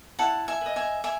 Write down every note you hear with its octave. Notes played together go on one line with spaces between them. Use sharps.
E4 F#5 A5
E5 G#5
B4 D#5
E5 G#5
E5 G#5